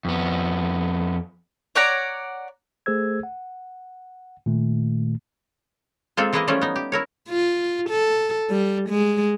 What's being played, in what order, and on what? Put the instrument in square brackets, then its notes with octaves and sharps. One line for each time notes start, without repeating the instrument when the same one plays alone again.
[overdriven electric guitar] F2 B3
[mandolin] C#5 D5 F#5 A#5
[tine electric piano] A3 G#4 A4 C5 E6 G#6
F#5
A#2 D#3 A3
[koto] G#3 A#3 C4 F4 A4
E3 G#3 A#3 E4 B4 D#5
E3 F3 G3 A3 C#4 F4
B3 D#4
G4
E4 A#4 C#5
[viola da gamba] F4
A4
G3
G#3